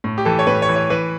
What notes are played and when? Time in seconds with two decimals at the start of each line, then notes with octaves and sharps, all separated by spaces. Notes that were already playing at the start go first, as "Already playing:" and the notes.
0.04 A2
0.18 G4
0.25 E3 A4
0.39 C#5
0.47 A2 B4
0.62 C#5
0.69 E3
0.76 C#5
0.90 E3 B4